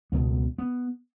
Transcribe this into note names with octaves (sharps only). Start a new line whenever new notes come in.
C#2 B2 B3
B3